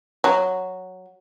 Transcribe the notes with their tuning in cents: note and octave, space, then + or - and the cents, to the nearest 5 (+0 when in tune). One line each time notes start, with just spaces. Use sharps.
F#3 +0